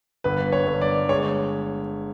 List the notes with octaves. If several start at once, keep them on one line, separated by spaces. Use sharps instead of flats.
G1 B4
C#5
G1
D5
G#3 C#5